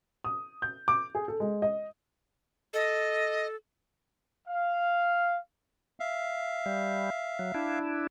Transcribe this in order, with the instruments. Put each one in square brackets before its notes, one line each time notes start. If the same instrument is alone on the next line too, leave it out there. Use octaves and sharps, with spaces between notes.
[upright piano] D#6
G6
D6
G#4
A4
G#3
D#5
[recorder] A4 [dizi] D#5
[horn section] F5
[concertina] E5 F5
[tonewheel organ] G3
F#3
D4 E4